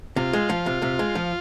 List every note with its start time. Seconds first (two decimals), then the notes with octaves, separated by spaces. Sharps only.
0.16 C3 F4
0.33 G#3
0.50 F3
0.66 C3
0.82 C3
0.99 G#3
1.15 F3